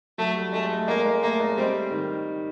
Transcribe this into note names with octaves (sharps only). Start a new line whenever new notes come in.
F#3 A3
G3
G#3 A3
A3
G#3 A#3
G#3
A3 A#3
G#3
G3 C4
D#3